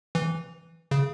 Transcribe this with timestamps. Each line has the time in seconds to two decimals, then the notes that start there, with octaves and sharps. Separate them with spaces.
0.15 E3
0.91 C#3